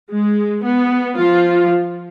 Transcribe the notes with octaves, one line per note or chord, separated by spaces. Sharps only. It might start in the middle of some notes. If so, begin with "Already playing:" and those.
G#3
B3
F3 F4